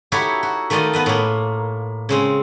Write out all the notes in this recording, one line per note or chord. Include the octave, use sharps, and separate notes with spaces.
D#4 E4 F#4 G4 A4 C#5
F#4
D#3 A3 F4 D5 D#5
B3 B4 D#5
A2 A#3
C#3 G#3 C4